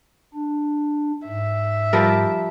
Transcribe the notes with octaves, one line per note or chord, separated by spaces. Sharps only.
D4
G#2 E5
F3 G3 A#4